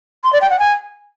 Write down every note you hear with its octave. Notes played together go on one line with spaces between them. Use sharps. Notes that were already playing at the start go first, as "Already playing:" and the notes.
C6
D5
G5
F#5
G#5